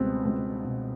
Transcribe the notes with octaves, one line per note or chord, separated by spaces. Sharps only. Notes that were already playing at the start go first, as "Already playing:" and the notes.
Already playing: C#2 B2 G3 B3 C4
C#2
B2